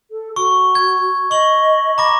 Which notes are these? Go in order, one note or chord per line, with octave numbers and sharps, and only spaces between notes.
A4
F#4 C#6
G#6
D#5 C#6 F#7
A#5 B5 D6 A#6